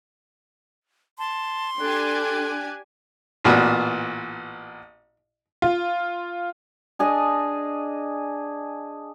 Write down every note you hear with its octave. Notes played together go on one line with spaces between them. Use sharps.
A5 C6
D4 G4 A4 G#5 F#6
A1 A#2 B3 F#4
F4
D4 G#4 D#5 A5